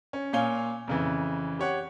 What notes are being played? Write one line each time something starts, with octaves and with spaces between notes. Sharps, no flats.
C#4
A#2 C#5 F5 G#5 G7
F2 C#3 E3
G4 C#5 F#5